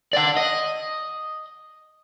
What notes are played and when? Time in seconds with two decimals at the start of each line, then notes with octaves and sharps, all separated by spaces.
0.13 D5 F#5
0.37 D#5